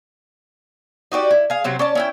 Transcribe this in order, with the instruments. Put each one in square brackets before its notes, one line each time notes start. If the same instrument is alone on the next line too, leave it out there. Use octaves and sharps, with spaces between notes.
[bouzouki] D#4 F#4 G4 D5
E4
G#4 F5
C3 F#3 C4
C#4 D5 A5
C#4 E4 G5